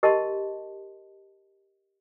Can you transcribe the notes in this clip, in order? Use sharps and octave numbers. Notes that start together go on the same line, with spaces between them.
G4 A#4 D#5 A5 C6